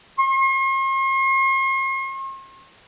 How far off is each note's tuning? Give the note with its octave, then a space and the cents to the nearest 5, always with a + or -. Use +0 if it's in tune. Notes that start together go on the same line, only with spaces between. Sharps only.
C6 +45